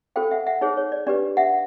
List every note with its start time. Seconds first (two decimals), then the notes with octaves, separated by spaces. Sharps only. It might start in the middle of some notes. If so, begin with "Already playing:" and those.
0.16 F4 A4 C5 F5 G5
0.31 E5 F#5
0.47 E5 F#5
0.61 D#4 G#4 C5 C#5
0.77 C#5
0.92 D5
1.07 D4 G4 B4 D5
1.37 E5 F#5